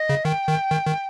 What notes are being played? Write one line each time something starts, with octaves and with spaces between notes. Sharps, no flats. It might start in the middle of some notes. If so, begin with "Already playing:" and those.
Already playing: D#5
C#3
D#3 G5
D#3
D#3
D#3